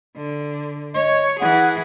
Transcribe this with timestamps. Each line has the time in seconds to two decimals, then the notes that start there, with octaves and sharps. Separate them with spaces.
0.17 D3
0.94 C#5 D#5
1.40 E3 G#4 F#5